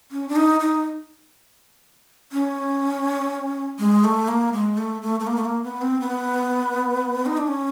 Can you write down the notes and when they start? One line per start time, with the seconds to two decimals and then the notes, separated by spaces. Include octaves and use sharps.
0.11 C#4
0.29 D4
0.36 D#4
0.60 D#4
2.32 C#4
3.79 G#3
4.04 A3
4.28 A#3
4.53 G#3
4.77 A3
5.02 A3
5.20 A3
5.27 A#3
5.36 A3
5.45 A#3
5.63 B3
5.82 C4
6.00 B3
7.26 D#4
7.37 D4
7.47 C#4